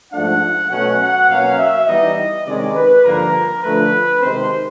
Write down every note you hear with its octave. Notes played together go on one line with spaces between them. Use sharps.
G#2 F3 A3 D4 F#5
B2 F#3 A3 C#4 F#5
F#5
B2 F#3 A#3 C#4 F5
E5
E3 G3 B3 D#4 D#5
C3 D#3 G#3 C#4 D5
B4
G2 D3 F3 A#3 A#4
D3 F3 A3 B4
C3 D#3 G#3 C4 C5